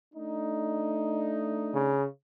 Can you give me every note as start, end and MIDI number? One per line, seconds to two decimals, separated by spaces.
0.15 1.98 57
0.15 1.98 62
0.15 1.98 63
1.74 2.06 49